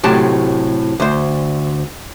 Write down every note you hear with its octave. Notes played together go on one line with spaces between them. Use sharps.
A2 C3 F#3 G4 A5
D2 C5